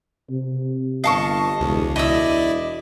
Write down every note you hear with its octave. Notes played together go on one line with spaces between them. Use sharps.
C3
G1 D#5 F5 A5 C#6
E1 C#2
E1 E4 D5 D#5 E6